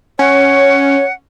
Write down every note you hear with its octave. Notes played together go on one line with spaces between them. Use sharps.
C#4 C#5 F#5